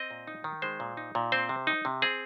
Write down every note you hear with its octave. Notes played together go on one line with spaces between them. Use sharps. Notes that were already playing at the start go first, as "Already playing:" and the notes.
Already playing: C4 D#5
A#2
D#4
D#3
G#3 C5
A#2
D#4
A#2
C4 C5
C3
D#4
C3
C4 G#4